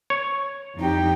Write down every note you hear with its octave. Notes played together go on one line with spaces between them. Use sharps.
C#5
F2 D#4 G4 G5